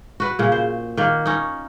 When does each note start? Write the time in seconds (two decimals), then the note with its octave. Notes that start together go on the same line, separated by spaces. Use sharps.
0.20 F#4 B4
0.39 A#2 C#3
0.52 C5
0.97 D#3 A#3
1.26 C#4 D#4